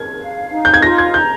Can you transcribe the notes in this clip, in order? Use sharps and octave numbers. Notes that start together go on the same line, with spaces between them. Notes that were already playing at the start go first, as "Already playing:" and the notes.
Already playing: A#4 G#6
F5
D#4
G6
G#6
F4 A#6
G#6
A#5 G6